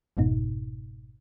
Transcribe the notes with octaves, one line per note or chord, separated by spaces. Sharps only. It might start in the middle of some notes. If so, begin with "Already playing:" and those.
G1 F2 G#2 B2 D#4